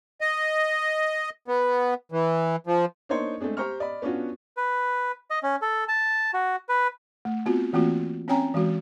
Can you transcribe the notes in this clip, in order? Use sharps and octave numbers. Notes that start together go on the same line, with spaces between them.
D#5
B3
E3
F3
A#3 D4 D#4 C5 C#5 C6
G#3 A3 C4 D4 G#4
G4 C5 A#5 C#6 F6
D5 D#5 B5
B3 C#4 D4 F4 F#4
B4
D#5
C#4
A4
A5
F#4
B4
A3
B3 C4 F4 F#4
E3 A3 A#3 C4 F4 F#4
C4 C#4 C#5 G5 G#5 A#5
E3 G#3 F#4